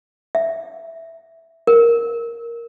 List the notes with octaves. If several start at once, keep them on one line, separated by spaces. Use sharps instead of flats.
E5
A#4